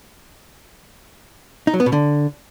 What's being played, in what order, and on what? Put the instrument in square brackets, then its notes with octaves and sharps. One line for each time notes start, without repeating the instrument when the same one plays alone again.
[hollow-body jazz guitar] D#4
F#3
B3
B2
D3